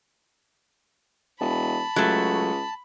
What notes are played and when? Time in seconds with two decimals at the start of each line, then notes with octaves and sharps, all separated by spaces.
1.40 E1 A5 B5
1.96 C#2 F#3 A3